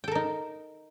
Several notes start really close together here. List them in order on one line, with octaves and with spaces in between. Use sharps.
G5 A4 A#4 D#4